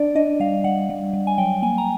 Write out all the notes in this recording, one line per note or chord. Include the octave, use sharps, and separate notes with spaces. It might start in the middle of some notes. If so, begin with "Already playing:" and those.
Already playing: D4 D5
D4 D#5
G3 F5
G3 F#5
G3
G3
G#5
F#3 G5
A#3 G#5
A#5